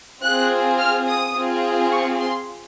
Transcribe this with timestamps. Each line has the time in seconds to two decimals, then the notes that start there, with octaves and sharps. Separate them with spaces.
0.23 C4 F4 G#4 F#6
0.79 F6
1.06 D#6
1.35 C4 F4 G#4
1.91 C#6
2.19 C6